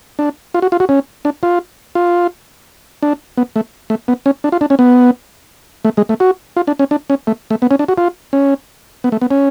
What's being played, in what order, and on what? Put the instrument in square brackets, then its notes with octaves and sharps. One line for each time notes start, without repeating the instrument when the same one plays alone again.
[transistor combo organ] D4
F4
F#4
F4
F#4
C#4
D4
F4
F4
D4
B3
A3
A3
B3
C#4
D4
F4
D4
C#4
B3
A3
G#3
A3
F#4
F4
D4
C#4
D4
C#4
A3
A3
B3
C#4
D4
F#4
F4
C#4
B3
A3
B3
C#4